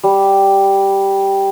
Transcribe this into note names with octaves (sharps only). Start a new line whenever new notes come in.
G3